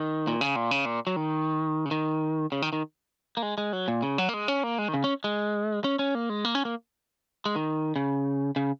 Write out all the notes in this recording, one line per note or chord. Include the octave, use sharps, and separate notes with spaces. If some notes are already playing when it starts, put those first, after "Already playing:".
Already playing: D#3
A#2
C#3
A#2
C#3
A#2
F#3
D#3
C#3
D#3
C#3
D#3
D#3
A#3
G#3
G#3
F#3
A#2
C#3
F#3
A#3
G#3
C#4
A#3
G#3
D#3
C#3
C#4
G#3
C#4
C#4
A#3
G#3
A#3
C#4
A#3
G#3
D#3
C#3
C#3